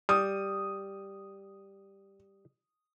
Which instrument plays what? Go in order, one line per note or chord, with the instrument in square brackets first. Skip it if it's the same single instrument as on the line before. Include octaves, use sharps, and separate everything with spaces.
[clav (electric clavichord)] G3 [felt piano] D#6